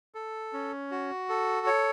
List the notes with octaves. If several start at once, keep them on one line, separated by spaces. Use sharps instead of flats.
A4
C#4
F#4
A4
C#5